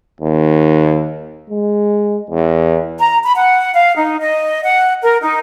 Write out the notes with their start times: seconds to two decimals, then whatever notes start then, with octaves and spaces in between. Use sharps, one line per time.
0.21 D#2
1.50 G#3
2.30 E2
2.99 A#5
3.24 B5
3.36 F#5
3.74 F5
3.97 D#4
4.20 D#5
4.64 F#5
5.03 A#4
5.22 D#4